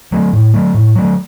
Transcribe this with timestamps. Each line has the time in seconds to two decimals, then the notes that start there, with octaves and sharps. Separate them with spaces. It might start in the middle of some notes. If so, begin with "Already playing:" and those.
0.12 F#3 A3
0.33 A2
0.54 F#3 A3
0.74 A2
0.96 F#3 A3